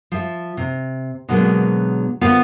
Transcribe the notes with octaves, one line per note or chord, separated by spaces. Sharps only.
F3 E5
C3
B2 D3 F#3 G#3 A#3 B3
D3 B3 F4 A#4 C5 F5